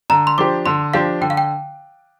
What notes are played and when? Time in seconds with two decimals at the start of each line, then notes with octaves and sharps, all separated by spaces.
0.10 D3 A#5
0.27 C6
0.38 F3 D4 G4 C5 D6
0.66 D3 C6
0.94 F3 D4 G4 C5 F5
1.21 D3 G5
1.30 F5
1.37 G5